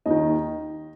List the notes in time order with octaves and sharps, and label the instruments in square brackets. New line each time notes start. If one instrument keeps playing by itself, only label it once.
[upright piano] D#2 D#3 D#5